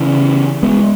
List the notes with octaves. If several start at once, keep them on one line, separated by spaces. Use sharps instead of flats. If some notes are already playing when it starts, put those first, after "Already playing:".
Already playing: C#3 E3
G#3 B3